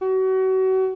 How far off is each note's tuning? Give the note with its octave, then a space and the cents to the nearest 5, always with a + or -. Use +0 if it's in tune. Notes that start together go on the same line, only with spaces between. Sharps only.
F#4 +35